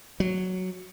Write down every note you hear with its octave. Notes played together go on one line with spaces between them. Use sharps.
F#3